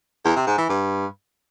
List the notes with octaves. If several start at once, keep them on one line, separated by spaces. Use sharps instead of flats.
E2
C3
G#2
E3
G2